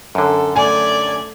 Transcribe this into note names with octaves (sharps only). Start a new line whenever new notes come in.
F#2 D3 A4
A3 D5 G#5 G#6